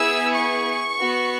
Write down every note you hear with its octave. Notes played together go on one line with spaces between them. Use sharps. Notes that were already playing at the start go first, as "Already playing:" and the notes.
Already playing: B3 E4 G#4 E6
C#6
B3 F#4